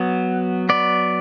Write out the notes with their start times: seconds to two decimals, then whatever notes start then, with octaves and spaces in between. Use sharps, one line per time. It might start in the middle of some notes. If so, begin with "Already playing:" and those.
Already playing: F#3 B3
0.69 F#3 B3 D5